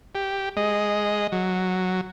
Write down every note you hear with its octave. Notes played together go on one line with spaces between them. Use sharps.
G4
G#3 D#5
F#3